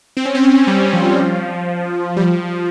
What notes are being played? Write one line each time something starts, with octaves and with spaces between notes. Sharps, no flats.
C4
C#4
C4
C#4
C4
G3
F3
G3
F3